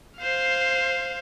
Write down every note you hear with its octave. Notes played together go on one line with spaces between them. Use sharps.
C5 F5